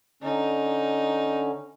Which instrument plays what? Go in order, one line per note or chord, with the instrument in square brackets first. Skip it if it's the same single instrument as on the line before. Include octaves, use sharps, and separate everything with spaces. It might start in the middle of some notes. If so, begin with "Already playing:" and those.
[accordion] D3 C#4 [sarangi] D#4